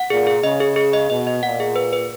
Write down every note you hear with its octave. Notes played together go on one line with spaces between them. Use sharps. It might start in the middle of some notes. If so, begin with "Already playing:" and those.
Already playing: F#5
A#2 G#4
G#4
C#3 D#5
G#4
G#4
D#5
B2 D#5
D#5
A#2 F#5
G#4
B4
B4